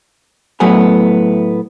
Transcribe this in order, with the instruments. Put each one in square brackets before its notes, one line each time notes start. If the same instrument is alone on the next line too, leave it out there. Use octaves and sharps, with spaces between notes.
[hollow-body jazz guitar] A2 F#3 A3 B3 G#5